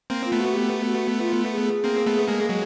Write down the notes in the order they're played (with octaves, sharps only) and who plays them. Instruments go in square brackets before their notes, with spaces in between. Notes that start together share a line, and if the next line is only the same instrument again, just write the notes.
[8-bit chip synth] A#3 C4
[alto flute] F4
[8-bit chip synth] A3 B3
[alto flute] F#4
G4
F#4
F4
G#4
[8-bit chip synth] A#3 C4
A3 B3
G#3 A#3
F#3 G#3